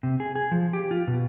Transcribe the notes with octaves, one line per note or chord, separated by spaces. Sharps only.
C3
G#4
G#4
F3
G4
F4
B2